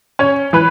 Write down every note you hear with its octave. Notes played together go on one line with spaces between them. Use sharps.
C#4 C#5
E3 B4